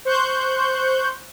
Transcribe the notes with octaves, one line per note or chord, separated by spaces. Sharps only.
C5 C#6 F#6 G6